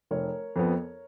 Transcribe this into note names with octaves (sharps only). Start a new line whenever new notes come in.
F1 A#4 C#5
F2 F3 B3